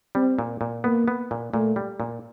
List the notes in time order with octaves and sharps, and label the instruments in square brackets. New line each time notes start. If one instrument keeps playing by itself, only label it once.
[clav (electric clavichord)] G3 [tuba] C4
[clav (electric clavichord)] A#2
A#2
[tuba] A#3 [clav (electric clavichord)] B3
[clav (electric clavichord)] B3
A#2
[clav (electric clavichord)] A#2 [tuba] A3
[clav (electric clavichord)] G3
A#2